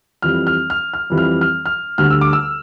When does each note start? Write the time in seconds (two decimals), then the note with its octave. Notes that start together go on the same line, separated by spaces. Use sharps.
0.22 F2 E3 G3 F6
0.47 F6
0.70 F6
0.94 F6
1.10 F2 E3 G3
1.18 F6
1.41 F6
1.66 F6
1.98 D2 D3 G3 F6
2.10 E6
2.21 D6
2.33 E6